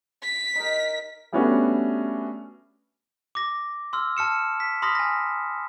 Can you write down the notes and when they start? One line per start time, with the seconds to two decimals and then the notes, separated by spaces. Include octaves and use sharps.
0.23 B6
0.55 D#4 A#4
1.32 G3 A3 B3 C#4 D4 F#4
3.35 D6 A#6
3.93 C6 E6 F6
4.17 A5 F6 C#7 E7
4.60 B6
4.82 B5 C6 D#6 F6 A#6 B6
4.95 G#5 A#6